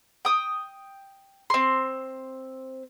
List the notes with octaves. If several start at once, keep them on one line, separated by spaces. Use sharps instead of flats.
G5 D#6
C4 C6